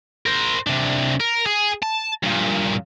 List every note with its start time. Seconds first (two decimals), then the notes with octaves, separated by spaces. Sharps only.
0.26 A#4 C5
0.67 C3 D4
1.20 A#4
1.46 G#4
1.83 A5
2.23 G2 A#2